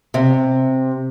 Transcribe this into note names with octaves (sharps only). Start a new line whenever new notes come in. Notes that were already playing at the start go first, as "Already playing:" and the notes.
C3